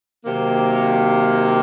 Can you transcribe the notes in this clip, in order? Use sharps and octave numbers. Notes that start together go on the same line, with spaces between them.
C3 D#3 F#3 A#3